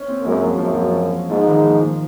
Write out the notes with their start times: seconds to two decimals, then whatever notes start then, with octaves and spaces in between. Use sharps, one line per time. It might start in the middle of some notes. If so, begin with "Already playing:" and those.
Already playing: C#4
0.08 C4
0.20 A#3
0.25 F#2 G#3
0.43 F3
0.50 F#3
0.59 F#2 F3
0.67 F#3
0.74 F3
0.82 F#3
0.90 F3
1.30 G#2 F3
1.48 D#3
1.66 F3
1.82 F3